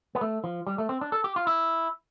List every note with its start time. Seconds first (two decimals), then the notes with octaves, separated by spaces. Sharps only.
0.15 B3
0.21 A3
0.44 F3
0.67 G3
0.78 A3
0.89 C4
1.01 D4
1.12 A4
1.24 G4
1.36 F4
1.47 E4